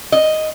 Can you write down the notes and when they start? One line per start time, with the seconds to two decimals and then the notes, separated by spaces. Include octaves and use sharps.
0.12 D#5